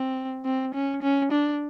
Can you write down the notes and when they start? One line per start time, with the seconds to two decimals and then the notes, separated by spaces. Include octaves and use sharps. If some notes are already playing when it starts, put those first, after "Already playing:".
Already playing: C4
0.45 C4
0.74 C#4
1.02 C#4
1.32 D4